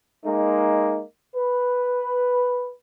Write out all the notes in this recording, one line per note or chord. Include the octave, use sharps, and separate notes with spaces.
G#3 A#3 D#4
B4